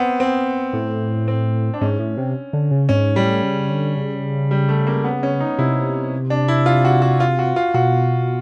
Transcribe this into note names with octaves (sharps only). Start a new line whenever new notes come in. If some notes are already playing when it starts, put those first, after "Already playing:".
Already playing: B3 C4
C4
A2
C4
D4
G#2 C#4
A2
C3
D3
C#3
G#2 C#4
A2 G3
C#3
D3
C#3
G3
A3
A#3
B3
C#4
D#4
C3 E4
D4
E4
F4
F#4
F#4
F4
F#4
F4
B2 F#4